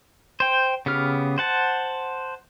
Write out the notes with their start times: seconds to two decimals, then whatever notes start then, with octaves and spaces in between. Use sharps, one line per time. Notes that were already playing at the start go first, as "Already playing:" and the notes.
0.40 C5 G5
0.86 C#3 B3 G4 F6
1.38 C5 F#5 A5